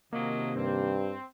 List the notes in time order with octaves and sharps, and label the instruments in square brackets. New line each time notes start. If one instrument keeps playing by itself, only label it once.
[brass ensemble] C3 D#3 [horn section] F3 F#3 D#5 [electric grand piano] A#3
[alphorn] G2 [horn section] C4